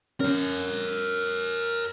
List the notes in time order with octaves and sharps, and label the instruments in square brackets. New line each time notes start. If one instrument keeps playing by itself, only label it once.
[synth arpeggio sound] C#4 [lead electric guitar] A#4 C#5